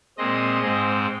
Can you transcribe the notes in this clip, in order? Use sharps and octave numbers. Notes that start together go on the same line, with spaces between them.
A#2 G#3 C4 D#5
G#2 G#3 C4